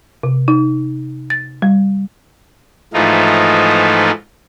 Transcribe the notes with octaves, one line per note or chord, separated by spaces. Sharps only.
C3
D#4
A6
G3
G#2 E3 F3 A3 D#4 F4